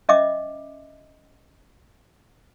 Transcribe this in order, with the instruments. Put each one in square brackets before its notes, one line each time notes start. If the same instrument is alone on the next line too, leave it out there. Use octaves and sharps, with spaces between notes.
[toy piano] C#4 D#5 E5 D6